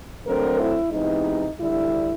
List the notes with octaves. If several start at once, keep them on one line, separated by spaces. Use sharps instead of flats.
D2 D3 F#3 A3 C4 A#4
E4
C3 E3 G#3 B3 D#4
D2 D3 G3 E4